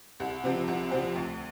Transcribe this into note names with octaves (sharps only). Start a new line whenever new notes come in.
C2
C3 F3 C4
C2
C3 F3 C4
D2